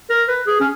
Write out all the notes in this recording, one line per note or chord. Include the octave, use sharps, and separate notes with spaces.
A#4
B4
G#4
C#4